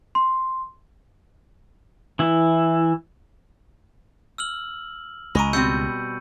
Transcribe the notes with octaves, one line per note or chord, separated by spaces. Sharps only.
C6
E3 E4
E6 F6 F#7
C#2 G#3 A#5 B5 C#6 D#7
B2 G3 C4 E6 G6 C#7